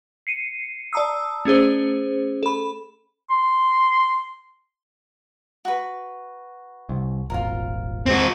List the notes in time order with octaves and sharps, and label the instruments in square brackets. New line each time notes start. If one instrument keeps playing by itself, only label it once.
[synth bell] C7 C#7 D#7
D5 A5 A#5 D#6 E6
A3 C#4 G#4 C5
A4 B5
[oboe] C6
[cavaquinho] F#4 B4
[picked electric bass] C2
[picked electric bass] D#1 G#1 [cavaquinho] F4 A#4
[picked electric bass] E2 G#3 [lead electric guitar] C4 F#4